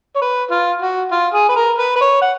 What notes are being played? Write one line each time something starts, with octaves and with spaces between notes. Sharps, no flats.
C#5
B4
F4
F#4
F4
G#4
B4
A#4
B4
B4
C#5
F#5